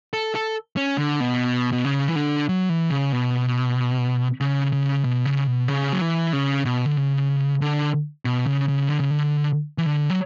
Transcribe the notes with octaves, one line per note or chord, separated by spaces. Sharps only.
A4
A4
C#4
D3
B2
B2
C#3
E3
D3
F#3
E3
C#3
B2
C#3
C#3
B2
C#3
B2
C#3
F#3
E3
C#3
B2
D3
C#3
D3
B2
C#3
C#3
D3
C#3
D3
E3
D3
F#3